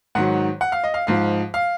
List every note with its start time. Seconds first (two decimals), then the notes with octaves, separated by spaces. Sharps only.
0.15 G#2 D#3 F#3 F#5
0.61 F#5
0.72 F5
0.84 D#5
0.94 F5
1.07 G#2 F3 F5
1.54 F5